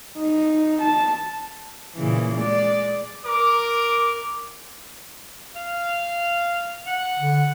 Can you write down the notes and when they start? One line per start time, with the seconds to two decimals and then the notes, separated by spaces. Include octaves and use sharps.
0.17 D#4
0.81 A5
1.95 A#2 C#3 E3
2.35 G#3 D5
3.25 A#4 D6
5.55 F5
6.87 F#5
7.17 D3